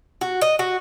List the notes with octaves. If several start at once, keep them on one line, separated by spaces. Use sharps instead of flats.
F#4
D#5
F#4